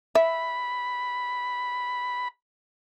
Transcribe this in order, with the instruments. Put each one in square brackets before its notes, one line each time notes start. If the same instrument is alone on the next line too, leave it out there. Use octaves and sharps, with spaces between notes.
[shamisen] E5 [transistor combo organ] B5